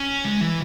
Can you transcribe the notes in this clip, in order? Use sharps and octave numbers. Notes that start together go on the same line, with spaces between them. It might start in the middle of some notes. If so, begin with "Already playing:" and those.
Already playing: C#4
G#3
E3